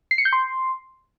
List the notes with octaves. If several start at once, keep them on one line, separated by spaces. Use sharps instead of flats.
C7
C#7
G6
C6